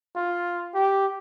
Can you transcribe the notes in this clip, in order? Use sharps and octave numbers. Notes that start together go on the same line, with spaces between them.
F4
G4